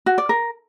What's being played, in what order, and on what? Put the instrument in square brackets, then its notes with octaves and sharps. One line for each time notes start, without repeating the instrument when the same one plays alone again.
[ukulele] F#4
D5
A#4